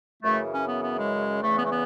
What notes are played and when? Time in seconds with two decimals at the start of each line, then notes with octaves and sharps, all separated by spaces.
0.22 F#2 C#3 E3 A3
0.52 C#4
0.67 B3
0.82 B3
0.96 G#3
1.41 E2 C#3 E3 A3
1.57 B3
1.64 A3
1.70 B3